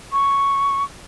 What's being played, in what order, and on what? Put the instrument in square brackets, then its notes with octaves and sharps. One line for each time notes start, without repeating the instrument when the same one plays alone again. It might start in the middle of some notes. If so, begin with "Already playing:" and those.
[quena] C#6